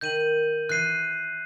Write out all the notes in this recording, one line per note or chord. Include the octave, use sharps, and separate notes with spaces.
D#3 G6 D#7 F#7
E3 F#6 C7 D#7